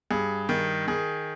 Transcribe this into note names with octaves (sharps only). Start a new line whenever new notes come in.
G2 G#4
D#3
D#3 G#4